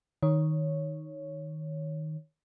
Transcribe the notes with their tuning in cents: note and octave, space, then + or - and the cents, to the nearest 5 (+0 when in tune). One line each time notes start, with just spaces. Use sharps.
D#3 +0 C#5 +0